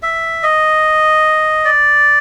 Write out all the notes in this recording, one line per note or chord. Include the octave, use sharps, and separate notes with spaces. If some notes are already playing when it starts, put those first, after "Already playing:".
E5
D#5
D5